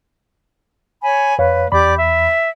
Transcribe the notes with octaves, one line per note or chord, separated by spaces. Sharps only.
C#5 G#5 B5
F2 B4 C#5 F5
E2 G4 D5 B5 D6
E5